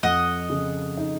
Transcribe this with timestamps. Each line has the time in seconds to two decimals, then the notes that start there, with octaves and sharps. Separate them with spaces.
0.03 F2 D#5 F#5
0.50 C#3
0.98 D#4